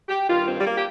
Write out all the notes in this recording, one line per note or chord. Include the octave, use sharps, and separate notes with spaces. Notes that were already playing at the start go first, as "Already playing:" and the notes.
G4
G2 D#3 F4
C4
G3
A#3
G4